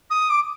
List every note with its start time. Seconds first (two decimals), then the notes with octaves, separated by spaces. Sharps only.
0.10 D#6
0.30 D6